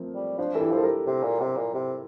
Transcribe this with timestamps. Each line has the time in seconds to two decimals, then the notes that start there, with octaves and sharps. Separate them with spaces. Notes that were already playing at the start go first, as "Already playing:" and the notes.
Already playing: F3 A3 A#3 C4
0.15 G3
0.38 F3 D4 F4
0.55 E3 A4
0.61 E4 G4
0.71 F3
0.78 A4
0.83 G4 A#4
1.07 C3
1.23 A#2
1.40 C3
1.57 A#2
1.74 C3